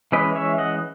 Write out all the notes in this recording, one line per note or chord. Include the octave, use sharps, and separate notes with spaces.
E3 G#3 C#4 B4 D#5
C#5 E5
D#5 F#5